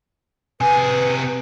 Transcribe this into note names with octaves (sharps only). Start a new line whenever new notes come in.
C3 G#4 B4 G#5